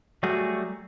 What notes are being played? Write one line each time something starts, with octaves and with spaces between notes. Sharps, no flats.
F#3 G3 A3 F#4 G#4